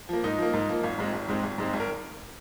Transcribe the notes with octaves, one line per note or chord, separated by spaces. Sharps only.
F3 A#3
G#2 D#4
F3 A#3
G#2
F3 A#3
G#1 F4
G#2 G#3 C4
G#1
G#2 G#3 C4
G#1
G#2 G#3 C4
G#1
A#4